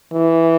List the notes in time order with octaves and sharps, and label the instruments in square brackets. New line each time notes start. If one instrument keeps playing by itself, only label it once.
[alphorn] E3